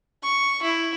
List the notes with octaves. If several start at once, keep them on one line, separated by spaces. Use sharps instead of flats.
C#6
E4